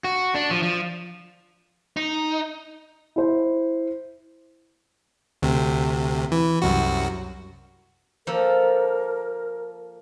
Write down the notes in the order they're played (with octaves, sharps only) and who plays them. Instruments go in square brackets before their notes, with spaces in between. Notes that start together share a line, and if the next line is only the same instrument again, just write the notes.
[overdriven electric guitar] F#4
D4
F3
F3
[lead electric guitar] D#4
[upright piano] E4 C5
[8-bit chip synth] D2 C3
E3
C2 F#2 F#4
[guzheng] F3 A#3 A4 [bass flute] A#4